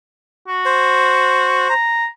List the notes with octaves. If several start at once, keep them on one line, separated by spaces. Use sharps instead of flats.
F#4
C5
A#5